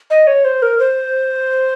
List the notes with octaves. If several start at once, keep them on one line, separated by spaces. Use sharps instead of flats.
D#5
C#5
C5
A#4
C5